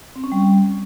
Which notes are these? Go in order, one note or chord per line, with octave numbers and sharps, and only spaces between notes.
C4
C#4
G3